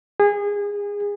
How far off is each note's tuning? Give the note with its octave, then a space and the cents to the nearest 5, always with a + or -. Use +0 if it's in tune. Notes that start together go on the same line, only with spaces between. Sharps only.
G#4 -25